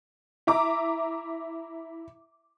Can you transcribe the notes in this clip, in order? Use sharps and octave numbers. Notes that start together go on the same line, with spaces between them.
E4 E5 A#5 D6